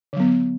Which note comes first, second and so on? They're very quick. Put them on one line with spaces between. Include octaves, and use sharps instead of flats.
D3 F#3 B3